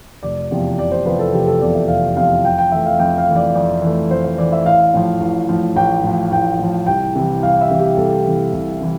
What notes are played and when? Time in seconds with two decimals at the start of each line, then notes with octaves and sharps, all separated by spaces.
0.23 F1 D5
0.51 E2 C3 F3
0.78 F1 D5
0.92 C5
1.06 E2 C3 F3 B4
1.19 A4
1.33 F1 G4
1.47 A4
1.61 E2 C3 F3 D5
1.75 E5
1.88 F1 F5
2.16 E2 C3 F3 F5
2.44 F2 G5
2.58 G5
2.71 E3 A3 E5
2.86 F5
2.99 F2 G5
3.18 F5
3.27 E3 A3
3.36 D5
3.55 F2 D5
3.82 E3 A3
4.10 F2 C5
4.24 C5
4.38 E3 A3 D5
4.52 E5
4.65 A1 F5
4.94 A2 F3
5.20 A1
5.49 A2 F3
5.76 A1 G5
6.04 A2 F3
6.32 A1 G5
6.59 A2 F3
6.86 C2 G5
7.15 C3 E3
7.43 C2 F5
7.61 E5
7.71 C3 E3
7.80 G4
7.97 C2 A4
8.25 C3 E3
8.53 C2
8.81 C3 E3